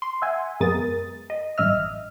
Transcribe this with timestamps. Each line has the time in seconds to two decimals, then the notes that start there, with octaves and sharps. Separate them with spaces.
0.02 C6
0.22 E5 F#5 G#5
0.60 F#2 G#3 B3 A#4 D#6 A6
1.30 D#5
1.58 A1 G2 D#5 E5 F6